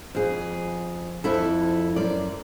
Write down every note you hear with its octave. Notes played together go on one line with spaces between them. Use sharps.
F2 G#4
F2 E4 A4
F#2 D5